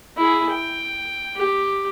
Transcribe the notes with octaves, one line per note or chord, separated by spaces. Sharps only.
E4 G#4
G5
G4